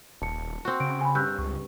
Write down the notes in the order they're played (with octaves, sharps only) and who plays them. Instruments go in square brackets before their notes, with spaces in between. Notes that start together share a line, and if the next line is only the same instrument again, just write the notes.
[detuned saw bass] D#1 [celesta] A5 C#7
[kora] C4 F#4
[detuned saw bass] C#3 [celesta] D7
[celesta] G#5 B5
[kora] G2 [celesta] E6 F#6 G6
[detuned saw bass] C#2 [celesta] C#6